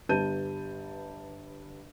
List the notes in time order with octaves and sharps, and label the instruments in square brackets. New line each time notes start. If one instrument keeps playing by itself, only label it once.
[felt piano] G1 G3 B4 A5 G6 D#7